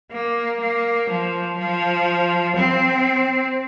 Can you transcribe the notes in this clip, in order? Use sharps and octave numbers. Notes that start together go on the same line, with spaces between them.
A#3
A#3
F3
F3
C4